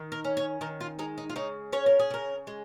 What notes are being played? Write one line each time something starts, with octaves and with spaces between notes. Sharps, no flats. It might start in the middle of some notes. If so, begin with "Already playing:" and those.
Already playing: D#3
A#4
C#4
C#5
D#3 A#4
F4
G#3 D#4
D#4
F4
C#3 D#4
C#4 C#5
A#4
G#4
C#3 A#4
G#3